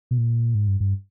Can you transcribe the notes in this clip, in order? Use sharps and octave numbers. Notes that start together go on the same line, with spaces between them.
B2
A#2
G#2
G2
G2